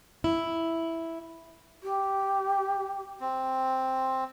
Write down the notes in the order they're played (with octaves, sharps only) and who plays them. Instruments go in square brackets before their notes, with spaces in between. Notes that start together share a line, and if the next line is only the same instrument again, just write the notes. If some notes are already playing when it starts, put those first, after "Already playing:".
[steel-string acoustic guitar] E4
[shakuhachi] G4
[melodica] C4